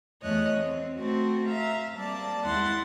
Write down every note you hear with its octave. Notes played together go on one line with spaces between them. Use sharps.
E2 A3 C#5 D#5 F#6
C4
A3 C4 F#4
E5 F5 A#5
G3 A#3 C4 D5 A5
D#2 G#3 E4 F#5 C6 A6